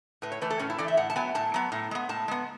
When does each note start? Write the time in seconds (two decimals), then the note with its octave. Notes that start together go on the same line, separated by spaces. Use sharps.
0.22 A2 B4
0.32 C#5
0.41 E3 A3 B4
0.50 A4
0.59 A2 C#4
0.70 E4
0.78 E3 A3 D5
0.88 E5
0.97 A2 F#5
1.10 A5
1.16 F#3 B3 G#5
1.35 A2 A5
1.54 F#3 B3
1.72 A2
1.91 G#3 B3
2.09 A2 A5
2.28 G#3 B3